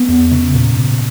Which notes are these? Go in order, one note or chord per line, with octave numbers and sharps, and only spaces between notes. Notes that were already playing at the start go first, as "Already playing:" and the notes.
Already playing: B3
E2
C#3
A#2
A#2